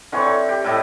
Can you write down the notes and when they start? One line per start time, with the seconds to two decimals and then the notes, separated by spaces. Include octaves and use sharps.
0.12 D3 E3 C4 C#5
0.25 D3
0.49 G4
0.64 A2 E4 A4 D#5